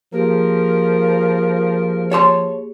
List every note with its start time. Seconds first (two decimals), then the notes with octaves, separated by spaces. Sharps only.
0.13 F3 A#3 G4 G#4 A#4
2.12 C#5 A5 C6